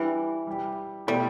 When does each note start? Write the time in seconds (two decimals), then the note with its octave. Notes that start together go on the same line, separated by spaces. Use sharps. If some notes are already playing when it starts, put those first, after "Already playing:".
Already playing: E3 G3 D4 G4
0.47 G3 E4 G4
1.07 B2 G3 A3 E4 G4